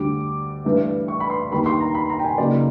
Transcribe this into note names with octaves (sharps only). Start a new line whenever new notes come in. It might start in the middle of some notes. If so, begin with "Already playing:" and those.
Already playing: D2 D3 G3 D6
G2 E3 A3 D4
C#6
B5
C6
D#2 D#3 G3 A#3 B5
C6
A#5
B5
A#5
G5
G#5
C#3 F#3 A#3 D#4 D5